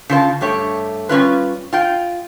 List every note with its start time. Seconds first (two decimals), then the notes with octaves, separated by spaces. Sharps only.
0.09 C#3 F4 C5 A5
0.41 G2 A3 G4 C#5
1.09 G3 C#4 F4 B4
1.73 F4 G5